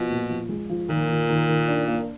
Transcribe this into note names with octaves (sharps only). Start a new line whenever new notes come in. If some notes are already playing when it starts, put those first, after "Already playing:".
Already playing: B2 F3
A#2
F3
G#3
F3
A#2 D#3
D#3
D#3
D#3
D4
A#3